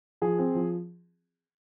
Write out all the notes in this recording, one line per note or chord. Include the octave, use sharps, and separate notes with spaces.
F3 G#4
C4
F3